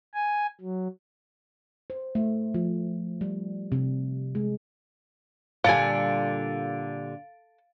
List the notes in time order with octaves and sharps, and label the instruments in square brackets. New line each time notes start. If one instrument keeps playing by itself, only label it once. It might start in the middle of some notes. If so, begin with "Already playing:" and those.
[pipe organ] G#5
F#3
[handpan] C5
A3
F3
G3
C3
G#3
[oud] A#2 D3 G3 [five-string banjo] A4 G#5 [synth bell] F5 A6 D7